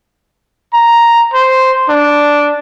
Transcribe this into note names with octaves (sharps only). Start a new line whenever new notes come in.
A#5
C5
D4